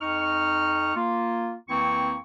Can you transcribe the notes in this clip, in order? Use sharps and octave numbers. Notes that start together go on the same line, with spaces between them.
F2 D#4 C#6 F6
A#3 F4
F2 E3 A#3 C4 E4 C#6